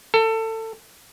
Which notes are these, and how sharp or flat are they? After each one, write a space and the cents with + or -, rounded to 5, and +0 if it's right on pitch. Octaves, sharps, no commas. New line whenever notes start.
A4 +25